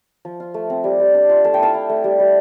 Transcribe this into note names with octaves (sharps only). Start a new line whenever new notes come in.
F3
F4
A3
C4
G3
G3
D4
F4
A3 A5
G5
E4 F5 A5
E4
A3
G3
G3